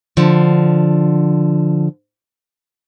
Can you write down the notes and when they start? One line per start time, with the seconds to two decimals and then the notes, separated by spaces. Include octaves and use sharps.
0.17 D3 F3